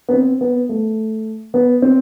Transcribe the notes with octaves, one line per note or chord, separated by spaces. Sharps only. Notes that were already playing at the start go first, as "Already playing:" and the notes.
B3
C4
B3
A3
B3
C4